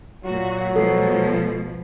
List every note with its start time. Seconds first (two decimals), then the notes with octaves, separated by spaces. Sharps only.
0.25 A#2 F#3 F#4
0.76 B2 F3 G#3 A4